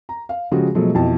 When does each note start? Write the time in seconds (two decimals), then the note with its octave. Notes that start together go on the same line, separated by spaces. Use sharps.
0.09 A#5
0.29 F5
0.51 C#3 F3 G#3 F#4 G4
0.75 B2 F3 F#3 G#3 A3
0.95 F2 B2 E3 A5